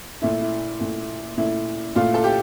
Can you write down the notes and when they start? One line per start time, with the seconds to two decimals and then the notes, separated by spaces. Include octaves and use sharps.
0.22 A#2 A3 E4
0.41 E4
0.80 A#2 A3 E4
1.37 A#2 A3 E4
1.95 A#2 A3 E4 F4
2.14 A4
2.24 G4